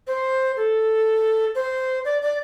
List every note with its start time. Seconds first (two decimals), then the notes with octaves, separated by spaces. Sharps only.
0.07 C5
0.57 A4
1.55 C5
2.05 D5
2.22 D5